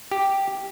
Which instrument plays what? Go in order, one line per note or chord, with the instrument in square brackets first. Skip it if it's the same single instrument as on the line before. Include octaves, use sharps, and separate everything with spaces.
[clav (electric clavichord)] G4